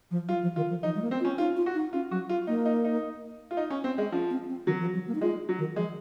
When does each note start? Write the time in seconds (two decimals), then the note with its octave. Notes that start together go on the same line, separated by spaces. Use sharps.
0.11 F3
0.28 F#3 F4
0.42 F3
0.56 D#3 F4
0.70 F3
0.83 F3 D#4
0.95 G#3
1.02 A#3
1.11 C4
1.21 F4
1.25 C#4
1.38 D#4 F4
1.57 F4
1.66 F#4
1.75 D#4
1.93 C#4 F4
2.11 F#3 F#4
2.29 F4
2.47 A#3 D#4
2.65 D#4
2.85 D#4
3.51 F4
3.57 D#4
3.70 C#4
3.84 C4
3.98 G#3
4.12 F3 C#4
4.30 C4
4.49 C4
4.67 D#3 F#3
4.80 F3
4.94 F#3
5.07 A#3
5.15 D#4
5.21 G#3 F4
5.49 F#3
5.58 D#3
5.76 F3 G#3